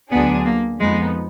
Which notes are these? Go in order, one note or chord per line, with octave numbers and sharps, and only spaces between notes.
D2 D3 F#3 B3 D4 G#4
A#3
F2 F3 G#3 B3 D#4